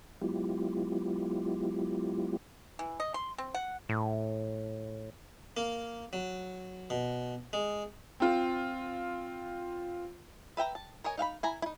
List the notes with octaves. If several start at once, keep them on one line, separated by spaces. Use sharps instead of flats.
F#3 G#3 B3 E4 F4 G4
E3
D#5
C6
C4
F#5
A2
A#3
F#3
B2
G#3
C4 F4
B4 E5 G5 A#5
A5
A#4 C#5 D#5 G#5
D#4 F5 G5 B5
E4 G#5 A#5
D#4 E4